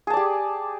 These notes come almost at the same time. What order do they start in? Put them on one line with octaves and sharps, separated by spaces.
G#4 A5 D5 G4